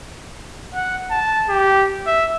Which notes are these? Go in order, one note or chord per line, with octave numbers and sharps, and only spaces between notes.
F#5
A5
G4
E5